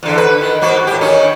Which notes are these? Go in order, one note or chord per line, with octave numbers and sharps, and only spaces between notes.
E2 D3
B4
D#3
G#2 A#3 F#4
A2 G4
D#3 C#4 D#4